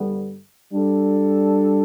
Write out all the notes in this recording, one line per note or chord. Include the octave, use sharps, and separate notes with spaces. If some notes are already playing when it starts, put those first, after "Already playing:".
Already playing: G2 D3 B3
G3 D4 A4